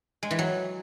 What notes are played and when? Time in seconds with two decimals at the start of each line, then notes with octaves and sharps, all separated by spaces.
0.23 G#3
0.31 E3
0.39 F#3